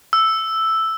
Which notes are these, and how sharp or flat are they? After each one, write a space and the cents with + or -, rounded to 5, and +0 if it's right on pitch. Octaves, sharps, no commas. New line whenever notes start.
E6 +0